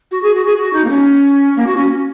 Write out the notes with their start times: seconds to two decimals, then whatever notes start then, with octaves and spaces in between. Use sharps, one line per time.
0.12 F#4
0.23 G#4
0.35 F#4
0.46 G#4
0.57 F#4
0.73 D#4
0.84 A#3
0.89 C#4
1.56 A#3
1.67 F#4
1.77 C#4